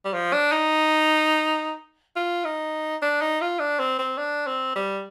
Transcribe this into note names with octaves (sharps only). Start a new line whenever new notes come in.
G3
F3
D4
D#4
F4
D#4
D4
D#4
F4
D4
C4
C4
D4
C4
G3